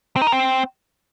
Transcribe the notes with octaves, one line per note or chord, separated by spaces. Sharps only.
C4
D#4
A#4
C4